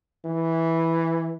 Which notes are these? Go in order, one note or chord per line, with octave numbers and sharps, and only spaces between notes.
E3